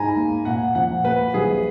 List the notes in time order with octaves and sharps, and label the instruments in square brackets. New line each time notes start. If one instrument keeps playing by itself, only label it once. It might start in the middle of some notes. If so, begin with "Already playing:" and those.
Already playing: [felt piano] G#2 [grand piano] G#5 A#5 B5
[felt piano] A#3
[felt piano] A#2 [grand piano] F#5
[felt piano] F3 [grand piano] F#5
[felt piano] A#3 [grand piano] B4
[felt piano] A#1 [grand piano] G#4